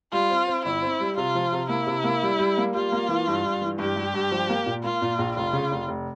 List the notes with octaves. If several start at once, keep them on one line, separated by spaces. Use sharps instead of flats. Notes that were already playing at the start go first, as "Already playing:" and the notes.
G3 F4
C4
C4
G1 E4
C4
G3
C3 F4
F3
C3
A#3 E4
C3
A#3
G3
G3
A#3
G3 F4
A#3
E3
G2
G2
E3
G2 G4
G2
G2
F3
A#3
A#2
A#3 F4
A#2
A#1
F1 F4
C#3
F1
F1